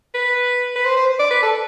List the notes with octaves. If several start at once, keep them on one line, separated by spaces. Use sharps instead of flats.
B4
B4
C5
C5
D5
B4
A4